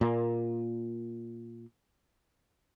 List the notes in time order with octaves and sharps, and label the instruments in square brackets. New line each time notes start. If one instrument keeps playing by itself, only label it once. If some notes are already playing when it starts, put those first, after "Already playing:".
[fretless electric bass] A#2 A#3